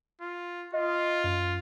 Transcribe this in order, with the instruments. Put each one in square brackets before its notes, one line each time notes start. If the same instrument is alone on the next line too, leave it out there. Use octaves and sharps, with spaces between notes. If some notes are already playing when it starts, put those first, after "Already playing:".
[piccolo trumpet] F4
[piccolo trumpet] F4 [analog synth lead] D#5
[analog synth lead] F#2